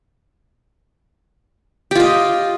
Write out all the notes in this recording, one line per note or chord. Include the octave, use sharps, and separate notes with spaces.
F4 G4 D#5